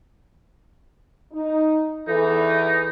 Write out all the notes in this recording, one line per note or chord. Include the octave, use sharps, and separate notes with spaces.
D#4
E2 E3 D#4 A4